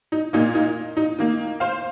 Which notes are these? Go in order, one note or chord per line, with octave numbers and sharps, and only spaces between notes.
D#4
A#2 A#3 D#4
D#4
D#4
D#3 A#3
C5 F5